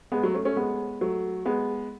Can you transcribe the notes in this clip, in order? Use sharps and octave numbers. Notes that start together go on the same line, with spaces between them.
G#3 B3
F#3 A3
A3 C#4
A3 C#4
G#3 B3
F#3 A3
G#3 B3